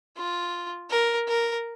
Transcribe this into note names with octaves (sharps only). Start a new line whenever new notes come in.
F4
A#4
A#4